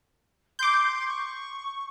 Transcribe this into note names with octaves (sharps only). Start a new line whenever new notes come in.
C6 D6 G6
C#6